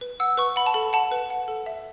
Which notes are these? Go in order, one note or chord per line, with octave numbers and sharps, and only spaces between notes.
B4
F#5 E6
B4 C#6
F#5 B5
A5
A4 B5
F#5 A5
B4
F#5
A4
E5